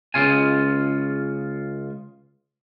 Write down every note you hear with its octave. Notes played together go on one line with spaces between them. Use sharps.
C#2 C#3 F4 G#5